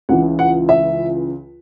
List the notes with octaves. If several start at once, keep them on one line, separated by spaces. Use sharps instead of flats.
C#2 C#3 E3 F#5
F#5
E5